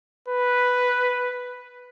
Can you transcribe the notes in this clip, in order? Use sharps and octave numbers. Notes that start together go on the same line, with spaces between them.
B4